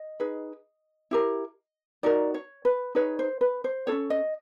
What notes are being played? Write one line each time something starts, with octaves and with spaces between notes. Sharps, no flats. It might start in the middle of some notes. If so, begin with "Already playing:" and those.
Already playing: D#5
D#4 G#4 B4
E4 G4 A#4
D#4 F#4 A#4 D5
C#5
B4
D#4 G#4 B4 C#5
C5
B4
C5
C#4 F4 A4 C#5
D#5